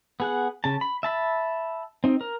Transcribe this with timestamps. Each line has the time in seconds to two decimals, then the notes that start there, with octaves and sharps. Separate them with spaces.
0.20 B3 G#4 F#5
0.64 C#3 A5
0.81 B5
1.03 E5 A5 B5
2.04 C4 D#4
2.21 A#4